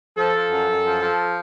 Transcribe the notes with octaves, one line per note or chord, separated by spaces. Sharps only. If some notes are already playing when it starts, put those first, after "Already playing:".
F3 A4
F3
F#2
F#2
F3
F3